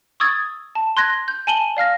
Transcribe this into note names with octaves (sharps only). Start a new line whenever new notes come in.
C#6 D#6 E6 G#6 A6
A5
C6 F#6 G#6 A#6
G6
G#5 A5 D#7 F#7 G7
D5 F5 F6 A#6